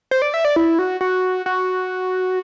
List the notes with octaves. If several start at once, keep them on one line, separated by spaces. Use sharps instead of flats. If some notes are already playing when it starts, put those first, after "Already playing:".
C5
D5
E5
D5
E4
F#4
F#4
F#4